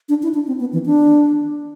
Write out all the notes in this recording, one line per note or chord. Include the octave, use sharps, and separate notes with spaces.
D4
E4
D4
C4
B3
E3
D4